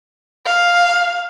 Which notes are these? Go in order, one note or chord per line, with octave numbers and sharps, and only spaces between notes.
F5